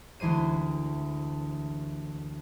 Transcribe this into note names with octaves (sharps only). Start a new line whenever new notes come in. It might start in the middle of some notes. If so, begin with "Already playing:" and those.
D2 E3 G#3 C5 D#7